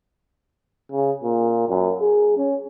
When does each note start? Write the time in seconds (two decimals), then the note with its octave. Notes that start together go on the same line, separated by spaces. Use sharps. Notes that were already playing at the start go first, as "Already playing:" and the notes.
0.92 C#3
1.23 A#2
1.69 F#2
2.01 G#4
2.37 C#4